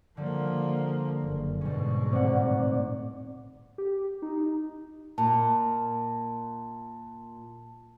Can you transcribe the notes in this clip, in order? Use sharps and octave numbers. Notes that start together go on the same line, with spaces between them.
D3 F3 G3 A#3
F#1
G#2 B2 G3 C#4
D#1 A2 C4 C#4 D5 F#5
G4
D#4
D#4
A#2 A5